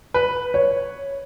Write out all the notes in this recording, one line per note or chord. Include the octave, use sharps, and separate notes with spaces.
B4
C#5